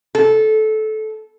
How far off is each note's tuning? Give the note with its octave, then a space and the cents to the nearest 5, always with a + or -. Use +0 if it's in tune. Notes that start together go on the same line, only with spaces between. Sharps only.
A4 -20